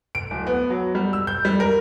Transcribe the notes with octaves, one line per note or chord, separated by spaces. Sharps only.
D7
D1
B3
F#3
G3
E6
G6
G3
A#4